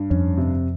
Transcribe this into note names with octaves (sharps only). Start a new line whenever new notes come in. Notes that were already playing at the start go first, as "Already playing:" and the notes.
Already playing: G2
F2 C#4
C3